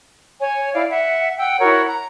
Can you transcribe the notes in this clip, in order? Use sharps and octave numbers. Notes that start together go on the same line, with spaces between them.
C#5 G#5
E4 D5 F5
E5 F#5
F#5 G5 E6
E4 F#4 A#4 C#5
A#5